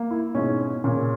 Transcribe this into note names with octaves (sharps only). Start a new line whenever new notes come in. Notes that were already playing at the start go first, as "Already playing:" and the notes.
Already playing: A#3
E4
G#2 B2 C#4
C#4
A#2 C#3 C#4